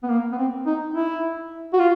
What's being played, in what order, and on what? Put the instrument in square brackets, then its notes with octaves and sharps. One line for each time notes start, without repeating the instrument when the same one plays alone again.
[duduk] B3
A#3
B3
C4
D#4
E4
F#4
F4